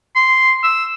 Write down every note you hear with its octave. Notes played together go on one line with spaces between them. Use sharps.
C6
E6